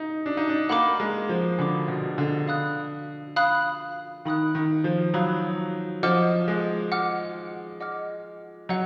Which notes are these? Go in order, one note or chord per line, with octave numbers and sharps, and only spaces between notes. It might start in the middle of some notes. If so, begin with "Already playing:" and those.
Already playing: D#4
D4
D#4
D4
A#3 F#5 B5 D6
G#3
F3
D3 F#5 B5 D6
B2
D3
F5 B5 D#6 F#6
F5 B5 D#6 F#6
D#3 F5 B5 D#6 F#6
D#3
F3
F#3 F5 B5 D#6 F#6
F3 D#5 F#5 D6 F6
G#3
D#5 F#5 D6 F6
D#5 F#5 D6 F6
F#3 D#5 F#5